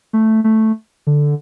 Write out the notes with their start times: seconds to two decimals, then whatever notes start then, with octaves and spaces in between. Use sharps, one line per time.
0.13 A3
0.44 A3
1.07 D3